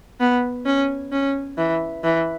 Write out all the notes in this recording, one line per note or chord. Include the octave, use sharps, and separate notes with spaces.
B3
C#4
C#4
E3
E3